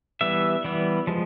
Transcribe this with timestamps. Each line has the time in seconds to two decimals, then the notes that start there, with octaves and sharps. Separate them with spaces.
0.21 E3 G3 B3 E5
0.65 E3 G3 B3
1.07 F3 G#3